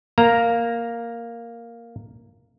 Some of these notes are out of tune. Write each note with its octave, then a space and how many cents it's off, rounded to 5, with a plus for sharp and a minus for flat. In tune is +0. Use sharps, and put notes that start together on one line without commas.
A#3 +0 A#5 +0